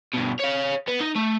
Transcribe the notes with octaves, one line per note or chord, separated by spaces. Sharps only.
G2 B2
C#5 F5
B3
D#4
A3